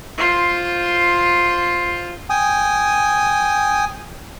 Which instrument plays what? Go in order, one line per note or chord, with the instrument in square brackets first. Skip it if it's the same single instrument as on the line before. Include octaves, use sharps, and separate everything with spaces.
[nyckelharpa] F4 C5
[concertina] G5 G#5 D#6